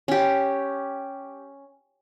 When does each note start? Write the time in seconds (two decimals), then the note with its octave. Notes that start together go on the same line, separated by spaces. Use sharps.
0.08 C#4 G4